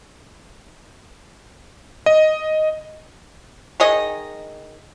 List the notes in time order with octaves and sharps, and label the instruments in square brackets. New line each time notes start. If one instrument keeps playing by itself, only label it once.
[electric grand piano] D#5
[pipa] D#3 G#4 D#5